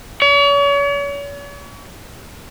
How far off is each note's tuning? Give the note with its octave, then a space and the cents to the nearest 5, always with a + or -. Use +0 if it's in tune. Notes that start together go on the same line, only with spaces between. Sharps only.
C#5 +40